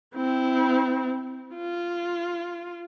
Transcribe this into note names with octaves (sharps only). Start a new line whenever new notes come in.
C4 E4
F4